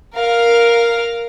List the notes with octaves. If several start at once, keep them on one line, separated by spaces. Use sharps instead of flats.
A#4 F5